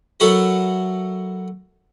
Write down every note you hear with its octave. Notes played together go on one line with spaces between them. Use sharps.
F#3 E4 F#4 A4 A#4